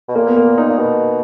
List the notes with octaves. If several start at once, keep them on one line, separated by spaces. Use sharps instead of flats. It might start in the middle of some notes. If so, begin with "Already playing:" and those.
B2
A#2 A#3
B3
A#3
D#4
A#2
B2